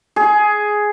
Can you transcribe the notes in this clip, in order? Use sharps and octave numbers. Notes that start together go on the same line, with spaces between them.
G#4